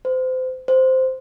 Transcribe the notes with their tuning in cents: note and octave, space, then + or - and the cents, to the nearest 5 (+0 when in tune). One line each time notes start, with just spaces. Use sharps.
C5 -30
C5 -5